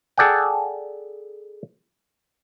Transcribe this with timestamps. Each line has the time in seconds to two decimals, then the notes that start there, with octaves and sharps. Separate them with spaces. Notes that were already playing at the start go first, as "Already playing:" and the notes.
0.17 G#4 A4 D5 F#5 G5